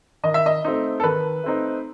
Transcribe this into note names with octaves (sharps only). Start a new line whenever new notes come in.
D#3 D#5
E5
D#5
A3 C4 D#4
A4
D#3 B4
A3 C4 D#4